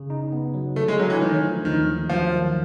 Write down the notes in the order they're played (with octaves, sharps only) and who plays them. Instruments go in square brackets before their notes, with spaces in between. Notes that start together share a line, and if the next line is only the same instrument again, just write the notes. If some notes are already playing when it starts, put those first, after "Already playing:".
Already playing: [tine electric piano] C#3
D#4
B3
F#3
[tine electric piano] D3 [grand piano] A3
[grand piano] G#3
[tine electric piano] D3 [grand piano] F#3
[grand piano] E3
[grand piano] D#3 [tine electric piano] A3
[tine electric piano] F3
[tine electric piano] D#2 [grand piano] D#3
[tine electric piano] D#2
[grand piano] F3 [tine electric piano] F#3
[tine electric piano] D#3